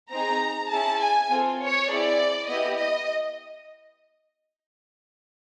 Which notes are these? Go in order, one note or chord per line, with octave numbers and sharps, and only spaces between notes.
C4 D#4 G#4 A#5
C#4 E4 G#4 A5
G#5
C4 F4 A4
C#5
C4 E4 G#4 D5
B3 E4 G4 D#5
D#5